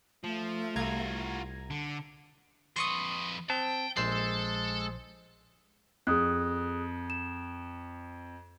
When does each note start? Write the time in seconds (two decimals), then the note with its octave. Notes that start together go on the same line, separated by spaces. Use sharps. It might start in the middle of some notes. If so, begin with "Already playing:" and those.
0.24 F3 A3
0.76 C2 F4 F#4 A#5 G#6
1.70 D3
2.76 F2 B4 C6 C#6 D#6
3.50 C4 G5 A5
3.97 A#1 G#3 A4 C5 C7
6.07 F2 G#4 D#6 F#6
7.10 E7